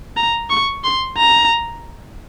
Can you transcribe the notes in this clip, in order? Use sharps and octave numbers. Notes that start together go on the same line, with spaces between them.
A#5
C#6
C6
A#5